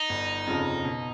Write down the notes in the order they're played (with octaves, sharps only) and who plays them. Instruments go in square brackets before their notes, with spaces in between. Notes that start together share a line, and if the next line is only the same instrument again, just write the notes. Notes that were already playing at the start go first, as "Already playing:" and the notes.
Already playing: [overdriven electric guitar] D#4
[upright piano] G1
F2 C#3 F3
B2